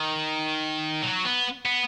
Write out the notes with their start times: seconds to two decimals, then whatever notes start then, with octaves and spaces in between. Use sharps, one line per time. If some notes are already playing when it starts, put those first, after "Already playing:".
Already playing: D#3
1.02 F#3
1.24 B3
1.66 B3